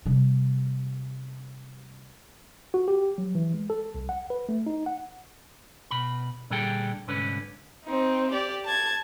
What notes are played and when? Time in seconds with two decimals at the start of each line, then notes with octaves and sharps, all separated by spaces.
0.06 C3 G3
2.74 F#4
2.88 G4
3.18 F#3
3.35 E3
3.54 G#3
3.70 A4
3.95 C2
4.09 F#5
4.30 B4
4.49 A3
4.66 D#4
4.86 F#5
5.91 B2 B5
6.50 A#2 D3 G3 G#4 A4 G5
7.08 C2 G#2 D3 C#4 B4
7.85 C4 D#4
8.31 G4 D5
8.65 A5 G#6